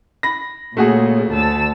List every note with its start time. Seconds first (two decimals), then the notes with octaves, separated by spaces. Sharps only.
0.23 B5 A#6
0.77 A#2 C#3 A3 F#4 G#4
1.32 D2 A5 E6